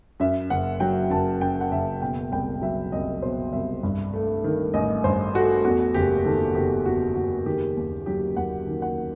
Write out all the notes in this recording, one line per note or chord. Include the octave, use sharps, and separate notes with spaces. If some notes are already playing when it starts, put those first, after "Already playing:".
F#2 E5
F#1 F#5
F#3 G5
F#1 A5
F#2 G5
F#5
F#1 E5
B2 G5
C2 G5
F#3 E5
C2 D#5
B2 C5
C2 E5
G2
A3
D#3
A1 D#5
G2 C5
A3 F#4
E2 F#4
F#1 G4
D#3 A4
F#1 G4
E2 F#4
F#1 F#4
D#3 G4
D#2
F#3 G4
D#2 F#5
D#3
F#5